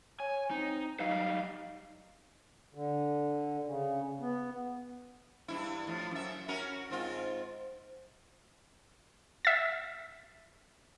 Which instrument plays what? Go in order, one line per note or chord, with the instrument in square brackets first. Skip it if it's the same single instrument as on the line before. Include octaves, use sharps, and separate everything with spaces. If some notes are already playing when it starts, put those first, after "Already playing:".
[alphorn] C#5 [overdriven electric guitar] G#5
[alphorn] C4 [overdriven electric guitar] D#4
[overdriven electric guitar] F#3 G3 [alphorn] D#4 [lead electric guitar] F5
[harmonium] D3
C#3
B3
[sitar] G2 B2 E4
A2 F3
F#2 E5
C#4 F#4 A#4
G#2 C4 F4
[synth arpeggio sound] E5 A6